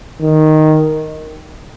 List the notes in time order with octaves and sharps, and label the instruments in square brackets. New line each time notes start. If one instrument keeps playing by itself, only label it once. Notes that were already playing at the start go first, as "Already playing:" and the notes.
[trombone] D#3